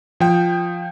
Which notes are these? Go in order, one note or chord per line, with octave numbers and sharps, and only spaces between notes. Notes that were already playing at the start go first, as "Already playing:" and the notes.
F3 G5